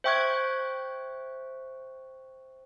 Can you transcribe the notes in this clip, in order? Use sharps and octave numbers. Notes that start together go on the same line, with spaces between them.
C5 E5 G5 C#6 F#6 G#6